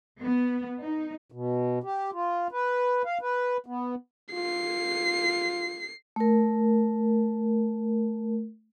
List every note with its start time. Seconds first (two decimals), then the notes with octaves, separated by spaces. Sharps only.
0.21 B3
0.80 D#4
1.32 B2
1.84 G4
2.13 F4
2.51 B4
3.05 F5
3.21 B4
3.66 B3
4.34 F4 C7
6.16 A3 A#4